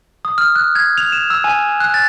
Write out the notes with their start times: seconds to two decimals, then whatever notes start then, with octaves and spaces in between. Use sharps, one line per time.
0.25 D#6
0.38 F6
0.56 F#6
0.75 G#6
0.98 F7
1.12 E7
1.30 E6
1.44 G#5
1.80 F#6
1.94 A6